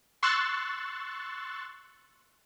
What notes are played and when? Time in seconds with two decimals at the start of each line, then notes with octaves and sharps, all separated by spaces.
0.23 C6 C#6 E6 F#6 A6